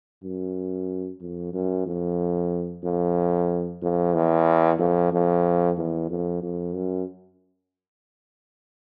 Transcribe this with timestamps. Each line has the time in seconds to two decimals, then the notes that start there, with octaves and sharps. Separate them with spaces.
0.23 F#2
1.21 F2
1.53 F#2
1.86 F2
2.84 F2
3.82 F2
4.14 E2
4.79 F2
5.13 F2
5.77 E2
6.10 F2
6.43 F2
6.75 F#2